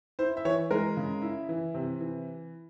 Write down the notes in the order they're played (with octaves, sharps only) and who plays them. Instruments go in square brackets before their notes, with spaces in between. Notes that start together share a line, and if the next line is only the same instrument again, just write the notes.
[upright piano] E4 C5
E5
E3 C#5
G#3 A#4
C#3
E4
E3
C3
E3